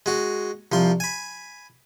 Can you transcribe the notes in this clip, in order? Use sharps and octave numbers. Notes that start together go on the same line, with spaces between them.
G#3 F#4
C2 F3 C6
G#5 B5